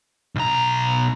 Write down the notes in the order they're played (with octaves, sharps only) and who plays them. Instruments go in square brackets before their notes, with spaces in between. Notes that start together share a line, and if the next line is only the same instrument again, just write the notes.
[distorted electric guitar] B1 A#5